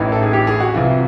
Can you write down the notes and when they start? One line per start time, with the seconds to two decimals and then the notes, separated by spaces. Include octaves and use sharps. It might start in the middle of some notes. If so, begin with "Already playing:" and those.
Already playing: A1 A2 E3 D#4
0.12 A4
0.23 G#4
0.33 G4
0.47 G#4
0.60 F#4
0.74 C2 C3 E3 F4